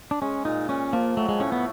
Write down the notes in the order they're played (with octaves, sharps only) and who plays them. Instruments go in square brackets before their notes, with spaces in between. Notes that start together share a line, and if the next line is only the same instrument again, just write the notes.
[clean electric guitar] D4
[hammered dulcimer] G#3 [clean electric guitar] C#4
[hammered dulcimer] A#2 [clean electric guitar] D#4
[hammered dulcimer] A#2 [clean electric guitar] C#4
[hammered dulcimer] F3 [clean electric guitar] A#3
[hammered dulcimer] F#3 [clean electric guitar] A3
[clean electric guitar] G#3
[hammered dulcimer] A2 [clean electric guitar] C#4
[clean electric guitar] B3